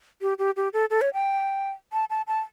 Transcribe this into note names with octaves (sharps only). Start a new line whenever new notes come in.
G4
G4
G4
A4
A4
C#5
G5
A5
A5
A5